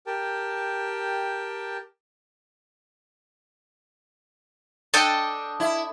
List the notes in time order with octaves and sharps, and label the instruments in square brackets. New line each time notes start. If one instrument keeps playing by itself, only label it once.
[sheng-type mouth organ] G4 A#4 G5 A5
[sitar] D4 [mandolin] A4 D#5 G5
[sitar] E4